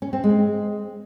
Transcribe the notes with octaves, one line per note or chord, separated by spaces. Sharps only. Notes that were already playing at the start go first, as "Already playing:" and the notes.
C#4
C4
G#3